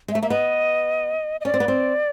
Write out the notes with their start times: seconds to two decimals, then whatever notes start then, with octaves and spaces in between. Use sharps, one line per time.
0.08 G#3
0.12 E5
0.15 A3
0.22 A#3 E5
0.30 B3 D#5
1.41 D#5
1.45 C#4 D5
1.54 C4
1.60 B3
1.68 C4